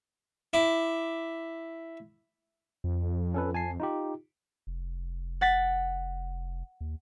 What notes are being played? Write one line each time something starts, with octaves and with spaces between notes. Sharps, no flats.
E4 D6
F2
C#4 A4 B4
G#5 A5 C7
D#4 F4 G4
F1
F#5 A6 B6
D#2